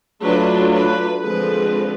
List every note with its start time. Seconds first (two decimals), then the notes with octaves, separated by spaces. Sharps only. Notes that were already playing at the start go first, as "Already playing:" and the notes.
0.23 F#3 A3 D4 F4 B4
0.72 B4
1.22 D3 F3 G#3 C4 B4